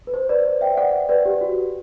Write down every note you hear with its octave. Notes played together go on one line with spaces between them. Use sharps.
B4
C5
B4 D5
C5
E5 G5
D5 F#5
B4 D5
G4
F#4